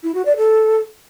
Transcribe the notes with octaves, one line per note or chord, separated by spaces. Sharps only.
E4
F#4
D5
A4